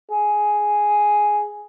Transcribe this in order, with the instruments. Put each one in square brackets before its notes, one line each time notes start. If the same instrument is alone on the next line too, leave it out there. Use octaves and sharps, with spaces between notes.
[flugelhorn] G#4